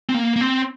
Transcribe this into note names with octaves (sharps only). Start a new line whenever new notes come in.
C4
A#3
A#3
C4